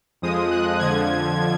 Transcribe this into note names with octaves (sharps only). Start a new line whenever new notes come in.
F2 F3 G#3 D#6
F#6
F2 D3 F3 G#6